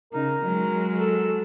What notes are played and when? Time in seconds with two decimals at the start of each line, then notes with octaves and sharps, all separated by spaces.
0.13 C#3 D#4 A#4
0.42 F#3 G#3
0.99 A4